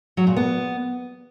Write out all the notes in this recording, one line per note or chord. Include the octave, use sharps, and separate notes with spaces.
F#3
A#2
B3